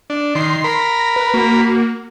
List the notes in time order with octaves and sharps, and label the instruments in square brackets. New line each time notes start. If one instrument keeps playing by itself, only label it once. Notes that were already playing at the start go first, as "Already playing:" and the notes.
[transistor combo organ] D4
[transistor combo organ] D#3 [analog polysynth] C6 C7
[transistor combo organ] A#4 B5
[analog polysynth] A#6
B4
A#3 F#4